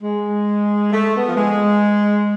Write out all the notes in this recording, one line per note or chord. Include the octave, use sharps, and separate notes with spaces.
G#3
A3
B3
F3
G#3